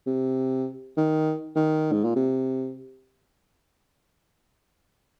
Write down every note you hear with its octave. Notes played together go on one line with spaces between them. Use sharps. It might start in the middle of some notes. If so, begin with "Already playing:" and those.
C3
D#3
D#3
G#2
A#2
C3